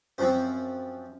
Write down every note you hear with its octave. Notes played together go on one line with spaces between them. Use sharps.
F#2 F3 C4 C5